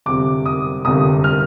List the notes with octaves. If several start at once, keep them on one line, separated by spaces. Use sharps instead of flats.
G1 F2 C3 G3 D6
D#6
G1 F2 C3 G3 D#6
F6